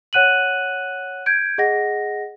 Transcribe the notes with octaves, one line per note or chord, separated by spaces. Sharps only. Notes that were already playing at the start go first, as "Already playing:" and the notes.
C#5 F#5 F#6 D#7 F#7
G6 G#6 D7
G#4 D#5 F#5 A#6